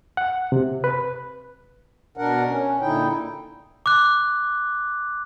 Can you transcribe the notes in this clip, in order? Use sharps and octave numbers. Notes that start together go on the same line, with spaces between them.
F#5
C3
B4
B2 D4 A#4 F#5
C#4
A#2 D3 D#4 E4 G5
D6 F#6